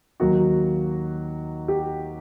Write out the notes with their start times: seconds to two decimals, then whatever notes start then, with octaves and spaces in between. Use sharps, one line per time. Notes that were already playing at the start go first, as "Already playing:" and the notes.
0.20 D#2 D#3 F#3 A#3 F#4
1.68 G4